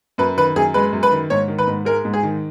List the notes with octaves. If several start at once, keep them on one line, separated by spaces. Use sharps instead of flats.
F#2 B4
D#3 B4
F#2 G#4
G#3 B4
F#2
B4
D#3
G#2 C#5
D#3
B4
G#2
G#3 A#4
G#2
G#4
D#3